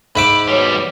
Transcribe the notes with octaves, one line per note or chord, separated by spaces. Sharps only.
G#2 E5 B5 D6
E2 B2 G3 B4 C#5